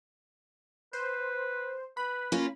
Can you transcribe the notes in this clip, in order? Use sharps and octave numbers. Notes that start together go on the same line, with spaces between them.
B4 C5
B4 B5
A#3 C#4 F4